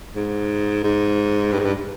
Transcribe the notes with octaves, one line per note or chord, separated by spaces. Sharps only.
G#2
G#2
G2
G#2
G2